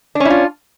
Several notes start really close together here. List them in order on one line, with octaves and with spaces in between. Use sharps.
D4 C#4 E4 F4